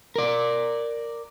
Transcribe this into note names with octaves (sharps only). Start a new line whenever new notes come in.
A#4 D5